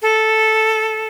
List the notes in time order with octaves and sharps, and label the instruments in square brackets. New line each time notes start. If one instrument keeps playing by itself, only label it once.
[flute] A4